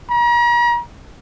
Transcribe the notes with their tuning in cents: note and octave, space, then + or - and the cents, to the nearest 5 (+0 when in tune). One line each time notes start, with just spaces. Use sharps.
A#5 +40